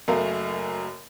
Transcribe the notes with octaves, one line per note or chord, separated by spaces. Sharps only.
F#1 F#2 A3 A#4 F5